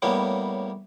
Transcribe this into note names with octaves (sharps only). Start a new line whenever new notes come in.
A2 G3 A#3 B3 C#4